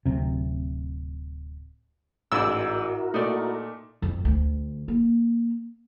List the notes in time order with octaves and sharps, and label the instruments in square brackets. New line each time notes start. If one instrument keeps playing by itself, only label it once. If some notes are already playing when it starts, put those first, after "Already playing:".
[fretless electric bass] D1 C3
[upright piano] A1 G#2 D6 [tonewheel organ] E4 F#4 A#4 [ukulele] D5 [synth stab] E6
[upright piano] A#2 A3 [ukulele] D#4 D5
[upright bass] F2
D2
A#3